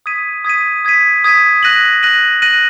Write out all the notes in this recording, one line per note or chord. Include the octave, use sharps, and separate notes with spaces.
D#6 G#6 B6 D#7
D#6 G#6 B6 D#7
D#6 G#6 B6 D#7
D#6 G#6 B6 D#7
F#6 A#6 D#7 F#7
F#6 A#6 D#7 F#7
F#6 A#6 D#7 F#7